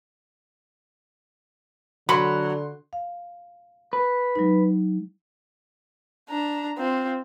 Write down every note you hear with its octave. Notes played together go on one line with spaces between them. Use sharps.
D3 F#3 B5 C6
F5
B4
F#3 G#3 D#4
D4 A#5
C4 F4